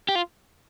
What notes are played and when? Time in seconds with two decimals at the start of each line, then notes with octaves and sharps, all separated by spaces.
0.09 G4
0.15 F4